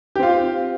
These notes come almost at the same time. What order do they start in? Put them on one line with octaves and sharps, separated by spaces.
G4 C4 F4